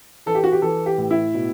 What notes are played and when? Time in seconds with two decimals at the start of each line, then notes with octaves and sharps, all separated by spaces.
0.26 E3 A4
0.35 G4
0.44 F#4
0.52 G4
0.62 E3 A4
0.86 G4
0.98 A2
1.11 E4
1.34 B2